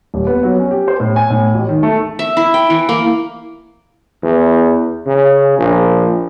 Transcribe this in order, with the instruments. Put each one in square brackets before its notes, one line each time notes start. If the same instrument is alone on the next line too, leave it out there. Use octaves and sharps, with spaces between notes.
[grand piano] D#1
B3
F#3
C#4
G4
C5
A2
G#5
A2
A1
D#3
A3
[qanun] E5
E4
G5
E3
A#3
[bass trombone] E2
C#3
A#1